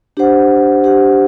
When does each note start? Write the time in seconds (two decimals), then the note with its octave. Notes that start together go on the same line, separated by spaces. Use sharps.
0.17 D4 G4 C5 F#5
0.84 D4 G4 C5 F#5